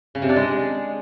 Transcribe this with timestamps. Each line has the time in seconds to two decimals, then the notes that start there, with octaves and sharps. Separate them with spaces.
0.15 C#3
0.22 C3
0.29 D4
0.36 G#3